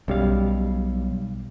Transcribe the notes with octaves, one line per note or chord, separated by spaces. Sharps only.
B1 F#2 G3 F5